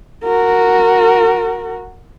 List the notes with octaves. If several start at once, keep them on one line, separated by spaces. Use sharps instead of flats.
F#4 A#4